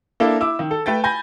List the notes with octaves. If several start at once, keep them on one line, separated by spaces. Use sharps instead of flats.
A#3 D4 E4 A4
E4 D6 E6
D#3
A4
A3 B4 G5 A6
G#5 B5 G6 A#6